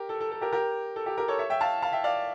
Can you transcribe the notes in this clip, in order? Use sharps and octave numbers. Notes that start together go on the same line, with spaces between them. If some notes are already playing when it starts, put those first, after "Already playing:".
Already playing: G4 A#4
A4
A4
A4
G4 A#4
G4 A#4
A4
G4
G4 A#4
A4 C#5
C#5 E5
E5 G5
F5 A5
F5 A5
E5 G5
D5 F5